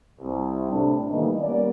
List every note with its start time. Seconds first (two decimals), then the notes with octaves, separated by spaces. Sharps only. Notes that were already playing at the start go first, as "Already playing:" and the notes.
0.21 C2
0.71 A2 C3 D4
1.10 D#3 E3 G3 A3 A#3 D#4
1.41 G3 A#3 B3 C#4 D5